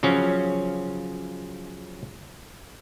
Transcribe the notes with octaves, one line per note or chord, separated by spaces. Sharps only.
C#3 F3 F#3 C#4